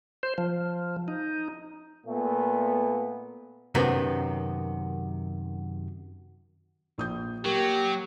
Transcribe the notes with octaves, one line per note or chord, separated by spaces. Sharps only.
C5
F3
D#4
A#2 A3 B3
F#2 C3 D#3 B3
A#1 D#6 G6
F#3 A#3 G4